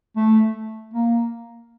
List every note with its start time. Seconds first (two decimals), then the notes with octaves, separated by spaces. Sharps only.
0.16 A3
0.94 A#3